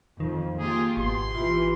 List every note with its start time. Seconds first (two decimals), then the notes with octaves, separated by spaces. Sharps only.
0.20 F2 D#3
0.59 A#3 F4 G4 G#4
0.97 G#1 B2 G4 C6
1.35 E3 F4 G4